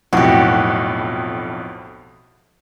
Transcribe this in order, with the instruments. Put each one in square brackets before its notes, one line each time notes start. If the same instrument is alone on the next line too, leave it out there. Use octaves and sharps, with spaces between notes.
[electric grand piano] B1 F2 A2 [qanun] F#4 G4